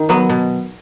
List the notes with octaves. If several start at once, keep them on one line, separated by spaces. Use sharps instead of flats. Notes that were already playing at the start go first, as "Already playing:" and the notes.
Already playing: D#3
F#3 B3
B2